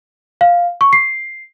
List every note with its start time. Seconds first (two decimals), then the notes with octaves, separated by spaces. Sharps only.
0.41 F5
0.81 C#6
0.93 C7